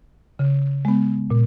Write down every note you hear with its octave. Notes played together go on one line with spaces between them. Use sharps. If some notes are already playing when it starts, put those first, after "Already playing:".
C#3
G#3 B3
A#2